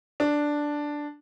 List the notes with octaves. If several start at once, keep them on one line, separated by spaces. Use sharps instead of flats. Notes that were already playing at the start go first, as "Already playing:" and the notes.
D4